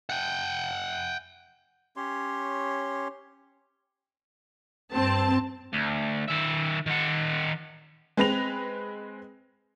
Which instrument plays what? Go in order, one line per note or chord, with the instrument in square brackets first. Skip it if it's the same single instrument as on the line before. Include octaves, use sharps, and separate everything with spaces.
[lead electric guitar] F#5 G5
[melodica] C#4 G4 C#5 C6
[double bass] G2 [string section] C4 A5
[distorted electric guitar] D2
D#3 E5
D#3 F#5
[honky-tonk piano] G#3 C4 B4 B5 A#6 F7